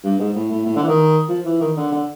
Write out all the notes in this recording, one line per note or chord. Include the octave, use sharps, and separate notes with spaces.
G2
G#2
A2
A2
A2
D3
E3
D#3
F3
E3
D#3
D3
D3